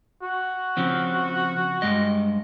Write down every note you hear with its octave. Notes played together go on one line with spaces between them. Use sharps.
F#4
C#3 F3 C4
G2 G#3 D#5